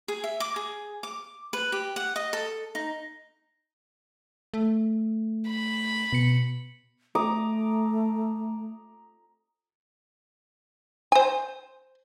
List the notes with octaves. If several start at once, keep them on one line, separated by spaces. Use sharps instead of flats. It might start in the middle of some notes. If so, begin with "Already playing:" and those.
G#4
E5
D6
G#4
D6
B4
G4
F#5
D#5
A4
D#4
A3
B5
B2 C#7
A3 A#5 D6 D#6
C5 G#5